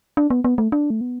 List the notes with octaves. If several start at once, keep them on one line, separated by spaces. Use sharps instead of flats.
D4
B3
B3
A3
D4
A3
B3